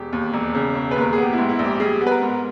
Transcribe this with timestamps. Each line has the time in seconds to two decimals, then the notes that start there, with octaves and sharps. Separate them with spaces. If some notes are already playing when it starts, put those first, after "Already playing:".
Already playing: E1 G4
0.13 D#2
0.34 E1
0.55 C#3
0.75 E1
0.91 D#2 B4
1.01 A#4
1.13 G#4
1.18 B3 G4
1.33 E4
1.38 G#2
1.49 E4
1.59 A#1 G4
1.80 G3 G#4
2.01 B3
2.07 B4
2.11 A#4
2.22 G#2